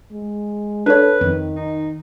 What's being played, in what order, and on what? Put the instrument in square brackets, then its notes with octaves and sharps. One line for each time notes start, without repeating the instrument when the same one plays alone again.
[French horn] G#3
[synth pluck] D4 C#5 [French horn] A4 [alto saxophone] B4
[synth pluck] F2 [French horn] D#3
[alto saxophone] D#4